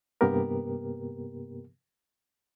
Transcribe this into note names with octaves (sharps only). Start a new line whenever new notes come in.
G2 C3 A#3 B3 G4 A#4